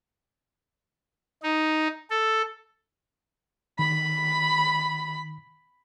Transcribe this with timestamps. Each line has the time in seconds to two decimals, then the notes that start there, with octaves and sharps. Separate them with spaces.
1.43 D#4
2.10 A4
3.79 D#3 B5